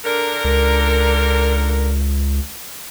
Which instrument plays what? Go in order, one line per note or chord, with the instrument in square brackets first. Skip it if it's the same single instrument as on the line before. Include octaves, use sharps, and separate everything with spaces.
[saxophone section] D3 D4 A#4
[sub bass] C#2